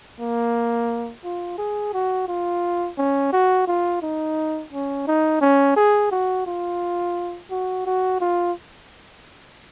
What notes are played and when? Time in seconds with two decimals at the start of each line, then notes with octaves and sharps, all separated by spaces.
0.20 A#3
1.24 F4
1.58 G#4
1.93 F#4
2.28 F4
2.98 C#4
3.32 F#4
3.67 F4
4.02 D#4
4.73 C#4
5.07 D#4
5.41 C#4
5.76 G#4
6.11 F#4
6.47 F4
7.51 F#4
7.86 F#4
8.21 F4